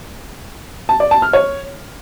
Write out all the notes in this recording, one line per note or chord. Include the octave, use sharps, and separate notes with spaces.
A5
D5
A5
F6
C#5